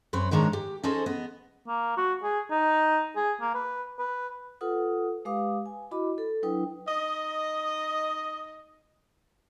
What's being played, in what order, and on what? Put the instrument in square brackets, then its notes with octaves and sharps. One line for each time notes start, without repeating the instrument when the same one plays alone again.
[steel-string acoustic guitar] F#2 C4 B4 C#5
G#2 D#3 G#3 D4 C#5 A#5
G4
C#4 D#4 G#4 A4 C5 D#5
B3 D#5
[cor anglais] A#3
F#4
G#4
D#4
G#4
A#3
B4
B4
[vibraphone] F4 A4 B4 F#5 D#6
G#3 G4 B4 F5 D6 D#6
G#5
E4 F#4 D#5 B5 D6
A4
F#3 D4 E4 B4 G5 D#6
[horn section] D#4 D#5